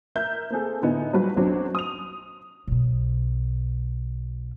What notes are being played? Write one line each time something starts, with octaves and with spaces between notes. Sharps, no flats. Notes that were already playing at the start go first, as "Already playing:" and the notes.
A#4 E5 G6
A#3 C4 G#4 A4
A2 D3 B3 D#4 E4 G#5
F#3 G3 F4 F#4 B4 C5
B1 F#2 F#3 C4 D4 F#4
D#6 F7
B1 B2